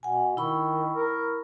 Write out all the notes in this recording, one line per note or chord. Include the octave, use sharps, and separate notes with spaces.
B2 F#5 G#5
D#3 E4 B5 C#6
A#4